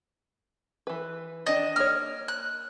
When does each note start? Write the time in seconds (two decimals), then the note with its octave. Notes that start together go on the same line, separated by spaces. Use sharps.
0.87 E3 B4
1.47 D#3 D4 D#5
1.76 A#3 C#5 F6
2.28 F#6